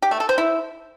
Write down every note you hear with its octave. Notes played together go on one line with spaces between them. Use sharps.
G4
A3
A4
C5
E4